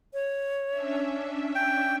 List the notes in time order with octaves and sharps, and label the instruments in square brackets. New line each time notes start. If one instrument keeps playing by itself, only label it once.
[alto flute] C#5
[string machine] C#4 D4 E5
[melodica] G5